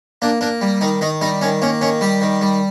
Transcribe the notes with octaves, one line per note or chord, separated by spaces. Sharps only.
A#3 D4
A#3 D4
G3
D#3 D#4
D#3 D#4
G3 D#4
D#3 C#4
A#3 C#4
D#3 C#4
G3 G4
D#3
G3